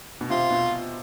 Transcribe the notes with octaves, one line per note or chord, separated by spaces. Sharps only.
B2
C3 F4
B2